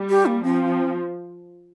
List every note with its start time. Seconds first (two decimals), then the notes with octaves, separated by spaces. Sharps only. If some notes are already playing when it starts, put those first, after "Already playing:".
Already playing: G3
0.10 G4
0.26 A#3
0.43 F3 C4